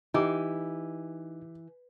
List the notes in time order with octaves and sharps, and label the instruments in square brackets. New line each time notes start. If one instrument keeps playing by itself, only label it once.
[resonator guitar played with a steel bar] E3 [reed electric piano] D#4 [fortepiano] G4